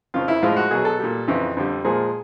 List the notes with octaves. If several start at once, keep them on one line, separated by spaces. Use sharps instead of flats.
F2 C#3 F3 F4
E4
A2 F3 G#3 F4
F#4
B2 F#3 G#4
A4
A#2 G3
F2 C#3 E3
F2 D3 G3
A#2 F3 G#3 G#4